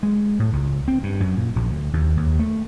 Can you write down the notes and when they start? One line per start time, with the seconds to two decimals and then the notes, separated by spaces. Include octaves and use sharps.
0.03 G#3
0.39 A2
0.53 C#2
0.88 C4
1.03 G2
1.20 F#2
1.37 A#2
1.56 A#1
1.71 D2
1.93 D#2
2.17 D#2
2.39 A3